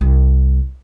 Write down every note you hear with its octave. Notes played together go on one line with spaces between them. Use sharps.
C2